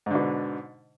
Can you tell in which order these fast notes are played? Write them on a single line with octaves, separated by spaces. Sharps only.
G#2 D3 B2